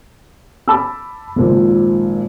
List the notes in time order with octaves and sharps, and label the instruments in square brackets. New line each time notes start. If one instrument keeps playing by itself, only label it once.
[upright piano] A5 B5 D6 E6
G#1 A#2 F3